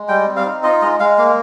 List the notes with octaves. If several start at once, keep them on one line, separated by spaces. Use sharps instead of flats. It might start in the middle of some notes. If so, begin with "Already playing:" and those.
Already playing: G#3
G3 G5
C4
F5
D#4
F4 D#5
G#3 D#5
G#3 F5
A#3 F5